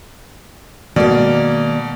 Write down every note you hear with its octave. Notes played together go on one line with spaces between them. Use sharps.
B2 D#3 G#3 A#3 D5